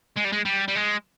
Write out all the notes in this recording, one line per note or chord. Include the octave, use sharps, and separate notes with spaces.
G#3
G3
G#3
G3
G3
G#3